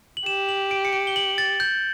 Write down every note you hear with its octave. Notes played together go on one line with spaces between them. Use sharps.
F#7
G4 E7
F#7
D7
C#7
D7
G7
F#7
A6
G6